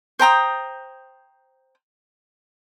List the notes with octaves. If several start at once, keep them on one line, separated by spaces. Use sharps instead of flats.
C5 G5 A#5 D#6